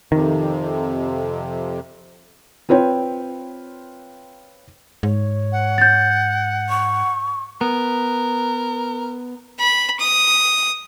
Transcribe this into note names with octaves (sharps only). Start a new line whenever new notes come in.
F2 C3 D#3
C4 F4 B4 C#5 G5
G#2 C#5
F#5
G6 A6
C#6
B3 A#4
B5
D#6